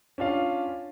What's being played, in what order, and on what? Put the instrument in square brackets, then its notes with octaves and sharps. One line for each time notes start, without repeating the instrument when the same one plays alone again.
[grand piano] C#4 D4 F4 F5